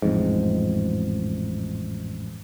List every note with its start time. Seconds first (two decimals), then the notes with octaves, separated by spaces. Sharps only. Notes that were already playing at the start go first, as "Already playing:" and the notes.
0.02 A1 F2 G#2